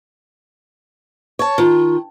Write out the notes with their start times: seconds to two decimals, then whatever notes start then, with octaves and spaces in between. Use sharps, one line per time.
1.39 C#5 A5
1.58 D#3 F4